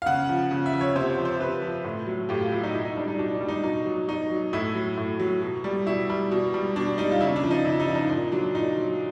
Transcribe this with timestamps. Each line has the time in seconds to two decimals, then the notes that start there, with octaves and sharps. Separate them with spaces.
0.02 F5
0.06 C#3 F#5
0.29 F3
0.51 C#3
0.66 E5
0.73 F3
0.81 C#5
0.96 C3 C5
1.10 C5
1.18 F3
1.25 C5
1.40 C3 B4
1.62 F3
1.84 A2
2.06 F#3
2.29 A2 G4
2.41 F4
2.52 F#3 E4
2.63 D#4
2.74 B2 E4
2.85 D#4
2.97 G3 D4
3.08 D#4
3.19 B2 D4
3.34 D4
3.41 G3
3.48 D#4
3.63 B2 D#4
3.85 F#3
4.08 B2 D#4
4.31 F#3
4.53 A2 E4
4.75 F#3
4.97 A2
5.19 F#3
5.41 B2
5.64 G3
5.86 B2 E4
6.10 G3
6.31 B2
6.54 G3
6.76 B2 D4
6.98 G3 D#4
7.11 F4
7.21 C#3 E4
7.36 D4
7.44 F3
7.51 D#4
7.65 C#3 E4
7.80 D#4
7.88 F3
7.95 D#4
8.09 A#2 D#4
8.32 F#3 D4
8.54 A#2 D#4
8.77 F#3